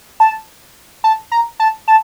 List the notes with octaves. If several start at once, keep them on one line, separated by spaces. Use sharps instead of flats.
A5
A5
A#5
A5
A5